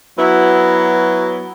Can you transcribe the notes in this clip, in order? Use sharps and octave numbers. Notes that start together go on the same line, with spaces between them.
F#3 B3 E4 F#4